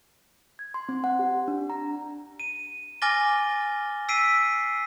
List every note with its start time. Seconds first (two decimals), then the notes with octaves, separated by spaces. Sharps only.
0.59 G#6
0.74 C6
0.89 C4
1.04 F#5
1.19 G4
1.48 D4
1.70 A#5
2.40 D#7
3.02 G#5 D6 F6 A6 A#6 G7
4.09 E6 B6 C7 D7 D#7